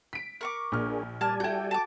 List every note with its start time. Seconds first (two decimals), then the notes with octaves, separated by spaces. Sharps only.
0.13 B6 D7
0.41 A#4 C#6 D6
0.72 A#1 A#3 D4 G#4 F6
1.21 G3 A#4 D5 G#5 A5
1.40 E4 F#4 A4 G5 G6
1.71 A5 D6